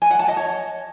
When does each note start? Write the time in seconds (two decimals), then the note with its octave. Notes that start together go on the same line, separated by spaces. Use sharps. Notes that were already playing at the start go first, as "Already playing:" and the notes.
0.02 G#5
0.10 F#5
0.19 A5
0.28 D#5
0.37 C#5